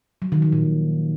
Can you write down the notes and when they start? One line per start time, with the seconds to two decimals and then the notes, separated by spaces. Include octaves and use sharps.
0.22 F#3
0.32 D#3
0.42 F3
0.52 A#2